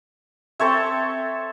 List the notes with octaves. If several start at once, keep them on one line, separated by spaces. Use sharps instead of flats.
C4 A4 C#5 E5